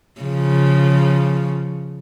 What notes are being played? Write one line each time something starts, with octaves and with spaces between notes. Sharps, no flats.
C#3 F3